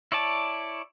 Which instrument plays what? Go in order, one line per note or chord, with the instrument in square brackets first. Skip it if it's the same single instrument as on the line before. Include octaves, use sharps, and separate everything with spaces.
[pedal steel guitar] E4 C#5 D5 A5